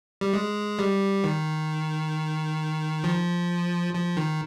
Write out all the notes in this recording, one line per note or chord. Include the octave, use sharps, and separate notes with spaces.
G3
G#3
G3
D#3
F3
F3
D#3